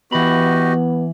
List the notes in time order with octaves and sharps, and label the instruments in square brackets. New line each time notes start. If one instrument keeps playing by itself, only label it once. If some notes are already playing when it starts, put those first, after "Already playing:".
[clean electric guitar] E3 B5 [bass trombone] B3 [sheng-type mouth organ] F#4 G4 D#5